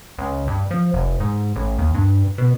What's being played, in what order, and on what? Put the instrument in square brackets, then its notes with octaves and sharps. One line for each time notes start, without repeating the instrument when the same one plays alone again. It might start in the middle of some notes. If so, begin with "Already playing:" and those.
[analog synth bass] C#2
G2
F3
F1
G#2
A1
D#2
G2
B2